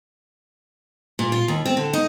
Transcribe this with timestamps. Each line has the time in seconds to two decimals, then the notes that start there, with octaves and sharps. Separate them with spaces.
1.19 A#2
1.32 F4
1.48 D#2
1.66 C4
1.77 D3
1.93 D#4